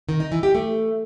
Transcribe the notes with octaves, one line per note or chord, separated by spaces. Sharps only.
D#3
D#4
E3
G4
A3